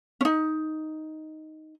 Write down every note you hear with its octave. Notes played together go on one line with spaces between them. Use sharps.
C#4 D#4